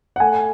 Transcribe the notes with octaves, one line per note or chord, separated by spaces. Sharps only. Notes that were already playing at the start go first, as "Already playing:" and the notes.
F#5
A3 G#5